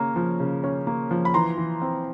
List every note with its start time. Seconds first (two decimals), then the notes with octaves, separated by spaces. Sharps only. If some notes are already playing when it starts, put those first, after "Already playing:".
Already playing: C#3 A#3 C#4 A#5
0.16 F3
0.40 C#3
0.64 C#4
0.87 A#3
1.11 F3
1.25 B5
1.34 E3 A#5 C6
1.57 E3
1.82 C4